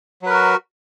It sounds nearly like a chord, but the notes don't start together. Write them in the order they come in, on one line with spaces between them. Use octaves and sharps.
F#3 B4 A#4 F#4